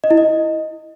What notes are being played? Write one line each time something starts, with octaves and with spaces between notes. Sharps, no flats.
D#5
E4
D#5